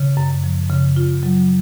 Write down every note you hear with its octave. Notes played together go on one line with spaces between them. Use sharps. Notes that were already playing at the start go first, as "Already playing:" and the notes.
Already playing: C#3
F#2
F3
C#3
F4
F#3